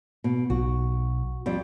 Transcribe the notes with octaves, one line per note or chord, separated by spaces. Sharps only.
B2
B1 F#4
F2 G3